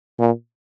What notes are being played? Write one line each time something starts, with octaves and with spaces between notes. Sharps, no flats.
A#2